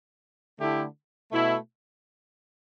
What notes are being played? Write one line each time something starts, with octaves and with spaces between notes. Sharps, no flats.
D3 A3 E4 G4
B2 A3 E4